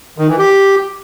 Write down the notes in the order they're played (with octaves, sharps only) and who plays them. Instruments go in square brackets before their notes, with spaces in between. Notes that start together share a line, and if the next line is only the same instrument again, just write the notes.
[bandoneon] D#3
E3
G4